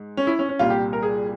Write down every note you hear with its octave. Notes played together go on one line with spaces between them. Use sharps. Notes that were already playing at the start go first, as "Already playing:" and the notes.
Already playing: G#2
C#4
E4
C#4
C#4
C2 A#2 G3 A#3 F4
G4
A#4
G#4